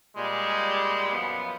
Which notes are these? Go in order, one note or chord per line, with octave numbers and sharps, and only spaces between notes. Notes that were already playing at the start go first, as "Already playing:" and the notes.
A#2 G3 G#3
F#2 F3 B3